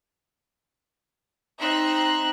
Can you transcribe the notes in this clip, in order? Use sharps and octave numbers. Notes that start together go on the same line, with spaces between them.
C4 D#4 E5 F#6